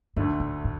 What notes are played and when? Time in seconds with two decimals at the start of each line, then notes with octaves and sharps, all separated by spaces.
0.16 D2 G2 D3 A3
0.40 A2
0.64 A2